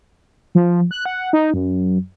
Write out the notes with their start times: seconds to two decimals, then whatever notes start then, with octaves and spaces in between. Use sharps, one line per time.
0.55 F3
0.91 F#6
1.06 F#5
1.33 D#4
1.54 F#2